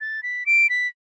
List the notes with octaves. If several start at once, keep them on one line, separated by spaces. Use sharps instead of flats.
A6
B6
D7
B6